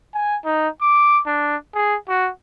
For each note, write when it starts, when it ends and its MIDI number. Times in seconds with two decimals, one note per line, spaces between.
0.14 0.37 80
0.44 0.68 63
0.82 1.20 86
1.27 1.56 62
1.74 1.96 68
2.09 2.30 66